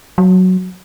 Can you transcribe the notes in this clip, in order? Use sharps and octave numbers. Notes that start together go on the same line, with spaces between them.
F#3